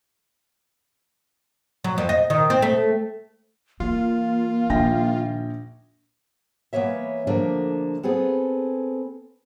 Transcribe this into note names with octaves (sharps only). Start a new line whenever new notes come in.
F#3
F2
D#5
D#3
C4
A3
E3 A#3 F4
A#1 D#3 G5 A#6
E3 A#3 B3 C#5 E5
D3 F3 A3 A#3 D4
B3 C4 G#4 A4